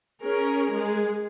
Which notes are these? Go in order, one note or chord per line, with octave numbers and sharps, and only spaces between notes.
C#4 G#4 A#4
G#3 G#4